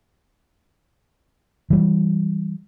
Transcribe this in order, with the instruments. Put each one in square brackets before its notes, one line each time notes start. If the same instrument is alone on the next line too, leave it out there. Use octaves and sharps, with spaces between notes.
[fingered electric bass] E3 G3